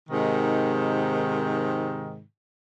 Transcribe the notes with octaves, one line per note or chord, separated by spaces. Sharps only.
G#2 C3 D#3